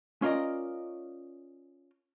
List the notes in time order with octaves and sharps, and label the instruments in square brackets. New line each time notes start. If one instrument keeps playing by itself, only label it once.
[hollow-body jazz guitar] C#4 F4 A#4 D5 D#5